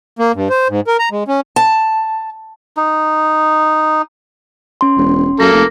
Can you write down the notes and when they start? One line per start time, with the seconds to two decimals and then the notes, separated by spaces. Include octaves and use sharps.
0.19 A#3
0.35 G2
0.50 C5
0.69 G#2
0.87 A#4
0.99 A#5
1.12 G#3
1.28 C#4
1.56 A5
2.77 D#4
4.81 C#4 C6
4.98 E1
5.40 F#2 A#3 A4 A#6
5.53 F1